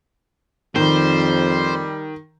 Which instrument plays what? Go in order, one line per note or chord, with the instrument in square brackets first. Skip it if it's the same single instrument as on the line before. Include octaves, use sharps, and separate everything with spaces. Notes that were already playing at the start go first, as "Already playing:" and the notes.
[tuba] F2 [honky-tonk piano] D#3 [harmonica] G3 [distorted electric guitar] C5